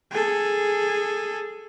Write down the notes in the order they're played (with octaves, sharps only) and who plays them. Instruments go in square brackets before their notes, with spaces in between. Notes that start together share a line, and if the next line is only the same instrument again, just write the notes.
[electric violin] G#4 A4